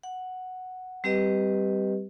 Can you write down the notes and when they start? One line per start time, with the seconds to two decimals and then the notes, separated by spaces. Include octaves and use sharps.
0.03 F#5
1.04 G3 C4 G4 B4 D#5